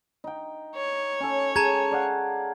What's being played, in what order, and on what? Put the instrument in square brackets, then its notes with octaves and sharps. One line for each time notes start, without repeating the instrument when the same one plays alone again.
[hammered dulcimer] D#4 G5
[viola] C#5
[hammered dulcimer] C#4 A4
[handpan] G#4 [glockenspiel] A5 A#5 G#6
[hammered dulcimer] D5 F5 F#5